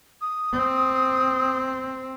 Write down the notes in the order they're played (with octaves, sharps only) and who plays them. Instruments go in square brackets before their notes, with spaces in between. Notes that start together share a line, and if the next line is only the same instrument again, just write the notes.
[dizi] D#6
[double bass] C4